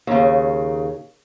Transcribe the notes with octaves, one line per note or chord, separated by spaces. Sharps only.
D#2 C#3